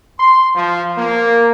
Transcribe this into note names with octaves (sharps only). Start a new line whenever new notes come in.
C6
F3
A#3